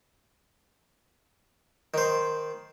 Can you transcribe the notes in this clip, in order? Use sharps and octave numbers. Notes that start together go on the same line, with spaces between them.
D#3 C5